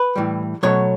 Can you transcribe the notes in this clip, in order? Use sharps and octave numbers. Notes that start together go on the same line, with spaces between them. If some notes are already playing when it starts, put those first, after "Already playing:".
Already playing: B4
A2 E3 G3
B2 F#3 A3 C#5